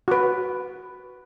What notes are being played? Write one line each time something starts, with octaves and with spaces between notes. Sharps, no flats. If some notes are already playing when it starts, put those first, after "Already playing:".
F#4 B4